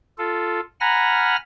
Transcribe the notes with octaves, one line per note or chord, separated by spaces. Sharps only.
F4 A4
F#5 G#5 A#5 B5 F6 A#6